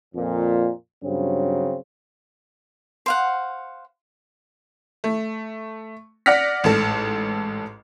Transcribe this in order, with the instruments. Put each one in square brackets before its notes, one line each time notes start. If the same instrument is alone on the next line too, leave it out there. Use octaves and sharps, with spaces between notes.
[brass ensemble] F2 A#2
G2 C#3 F#3 C4
[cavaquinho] C5 F5 F#5
[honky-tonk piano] A3
D5 F#5 F6 A#6 B6
A1 G#2 A4